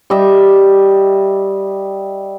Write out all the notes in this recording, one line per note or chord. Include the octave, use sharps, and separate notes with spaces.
G3 D#5 E5